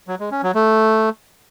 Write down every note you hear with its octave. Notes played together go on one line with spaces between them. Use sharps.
F#3
G#3
C#4
F#3
A3